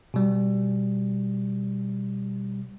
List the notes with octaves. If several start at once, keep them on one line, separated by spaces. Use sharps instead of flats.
B2 G3